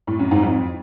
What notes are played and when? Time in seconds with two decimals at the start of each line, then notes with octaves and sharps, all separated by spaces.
0.07 A2
0.19 F#2
0.31 G#2
0.43 F2